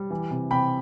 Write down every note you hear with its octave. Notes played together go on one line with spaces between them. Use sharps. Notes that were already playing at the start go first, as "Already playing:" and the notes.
Already playing: G3
E3
C3
C3 G5 B5